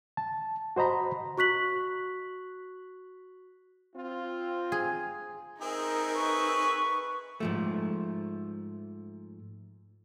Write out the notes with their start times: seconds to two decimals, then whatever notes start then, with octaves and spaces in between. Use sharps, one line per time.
0.17 A5
0.76 F#4 C5 D#5 A#5 B5
1.38 F#4 C#6 F#6 B6 F#7
3.96 C4 F4
4.72 G#4
5.62 C4 D#4 G#4 A#4 E5
6.15 B4 C#6
7.40 G#2 F3 A3